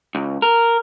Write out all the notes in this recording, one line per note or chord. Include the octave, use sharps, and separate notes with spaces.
C#2
A#4